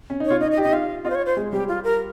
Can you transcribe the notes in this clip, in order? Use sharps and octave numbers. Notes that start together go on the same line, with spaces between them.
C#4
D#4
C#5
F4
D#4 D#5
D#5
G4
D#4 D#5
F4 F5
F4 D#5
C5
C#5
C5
G#3
G3 G4
F4
A#4